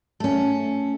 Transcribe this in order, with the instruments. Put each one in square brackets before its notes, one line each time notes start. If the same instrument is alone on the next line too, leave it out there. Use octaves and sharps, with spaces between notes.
[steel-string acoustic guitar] A3 C#4